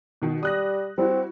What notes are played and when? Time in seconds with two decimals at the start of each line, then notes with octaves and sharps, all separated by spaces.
0.22 B2 D#3
0.43 G3 D#6 F#6 A#6
0.98 G3 C4 E4 F#4